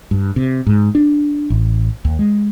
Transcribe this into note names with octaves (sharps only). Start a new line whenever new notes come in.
G2
C3
G#2
D4
A1
D#2
G#3